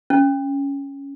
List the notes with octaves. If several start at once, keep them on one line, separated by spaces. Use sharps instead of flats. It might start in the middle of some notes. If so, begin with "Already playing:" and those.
C#4